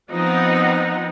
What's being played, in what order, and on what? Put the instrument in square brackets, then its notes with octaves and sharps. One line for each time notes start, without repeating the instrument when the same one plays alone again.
[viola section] F3 B3 C4 D#4 D#5 F#5